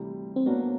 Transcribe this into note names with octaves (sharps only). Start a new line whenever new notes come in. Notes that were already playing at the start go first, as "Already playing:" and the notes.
Already playing: D2 C3 E3 G3
C4
A2 F#3 A#3 B3 D4 F#4